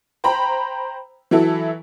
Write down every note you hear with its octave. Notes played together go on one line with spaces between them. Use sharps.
C5 G5 A#5 B5
E3 F#3 E4 A4